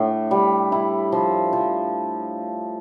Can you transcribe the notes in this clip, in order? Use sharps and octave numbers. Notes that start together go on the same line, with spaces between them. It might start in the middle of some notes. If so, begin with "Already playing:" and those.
Already playing: A2 D4 E5
G3
E4
F3
F3